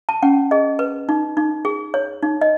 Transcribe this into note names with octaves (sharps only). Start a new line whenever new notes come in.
A5
C#4 F#5
G#4 D#5
B4
D#4
D#4
G#4
C#5
D#4
D#5